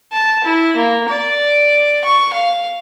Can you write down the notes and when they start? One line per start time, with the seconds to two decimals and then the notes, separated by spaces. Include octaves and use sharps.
0.12 A5
0.44 E4
0.77 A#3
1.09 D5
2.05 C#6
2.34 F5